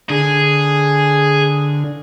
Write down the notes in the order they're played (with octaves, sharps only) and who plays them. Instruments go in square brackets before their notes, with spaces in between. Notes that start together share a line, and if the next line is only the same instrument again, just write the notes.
[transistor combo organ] D3 [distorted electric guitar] G#4